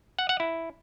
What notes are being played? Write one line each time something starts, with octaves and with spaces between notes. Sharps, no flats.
F#5
F#5
E4